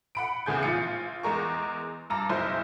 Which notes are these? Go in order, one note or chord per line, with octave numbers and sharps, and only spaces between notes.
F#5 B5 D7
E2 A2 C#3 G#4 G6
A#1 F4 C#7
E2 G#3 A#4 C#6
G2 A5 A#5 D6
F#1 B1 E4 C5